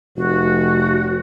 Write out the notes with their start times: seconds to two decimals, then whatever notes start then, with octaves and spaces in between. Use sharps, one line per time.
0.17 F1 F#4